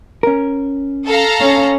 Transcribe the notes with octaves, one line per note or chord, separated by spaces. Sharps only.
C#4 A#4
A4 F5 A#5
C#4